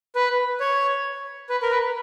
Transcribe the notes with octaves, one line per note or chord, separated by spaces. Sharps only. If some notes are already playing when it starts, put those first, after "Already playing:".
B4
C#5
B4
A#4
B4